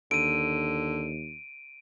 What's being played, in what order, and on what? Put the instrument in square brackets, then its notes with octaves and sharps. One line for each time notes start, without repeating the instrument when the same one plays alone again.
[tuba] D#2 [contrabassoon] D3 [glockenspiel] D7 D#7